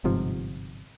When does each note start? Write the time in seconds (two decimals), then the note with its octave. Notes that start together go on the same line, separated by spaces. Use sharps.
0.04 G1 G#2 C3 F3